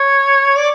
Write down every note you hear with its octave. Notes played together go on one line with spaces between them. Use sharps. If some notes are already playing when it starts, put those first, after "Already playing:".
Already playing: C#5
D5